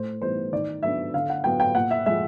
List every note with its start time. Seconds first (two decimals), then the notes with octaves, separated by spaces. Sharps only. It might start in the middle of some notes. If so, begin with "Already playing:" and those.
Already playing: A2 C5
0.22 E3 G3 B3 D#4 C5
0.53 D#3 D5
0.83 F#3 B3 D4 E5
1.14 D3 F5
1.30 F#5
1.44 F#3 B3 G5
1.60 G5
1.75 A#2 F#5
1.91 E5
2.06 F3 G#3 E5